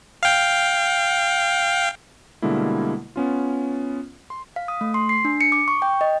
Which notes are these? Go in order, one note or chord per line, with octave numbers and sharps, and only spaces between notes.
F5 G5
B2 D3 G3 G#3 A#3 E4
B3 C#4 F4
C6
F5
D#6
A3
C6
C7
D4
C#7
D6
C#6
G5
D#5